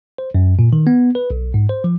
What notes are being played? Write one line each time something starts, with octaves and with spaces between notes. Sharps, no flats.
C5
F#2
A#2
D#3
B3
B4
B1
G#2
C5
F3